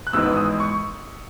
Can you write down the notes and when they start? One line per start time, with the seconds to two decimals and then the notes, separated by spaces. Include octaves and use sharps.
0.07 F#6
0.13 G#1 G#2 E3 B3 D#4 E6
0.37 D#6
0.60 C#6